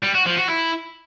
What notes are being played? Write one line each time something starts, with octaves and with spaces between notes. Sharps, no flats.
G3
F#4
F3
F#4
E4